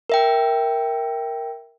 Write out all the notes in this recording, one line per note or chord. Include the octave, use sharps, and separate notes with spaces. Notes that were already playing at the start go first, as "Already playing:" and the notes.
A#4 E5 G5